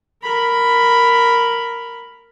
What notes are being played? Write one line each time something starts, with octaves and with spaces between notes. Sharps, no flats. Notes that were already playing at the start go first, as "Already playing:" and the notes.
A#4 B5